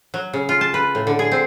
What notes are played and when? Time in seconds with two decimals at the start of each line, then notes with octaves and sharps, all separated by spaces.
0.14 F#3
0.33 C#3
0.49 F4
0.61 A5
0.74 B4
0.95 A2
1.07 D3
1.19 G#4
1.32 C4